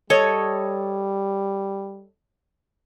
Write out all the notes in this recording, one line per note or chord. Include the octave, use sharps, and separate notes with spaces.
G3 A4 C#5 D#5